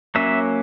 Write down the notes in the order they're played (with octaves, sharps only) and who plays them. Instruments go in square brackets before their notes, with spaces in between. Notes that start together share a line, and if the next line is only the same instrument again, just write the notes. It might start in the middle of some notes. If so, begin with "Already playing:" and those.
[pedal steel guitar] F#3 A#3 C#4 E5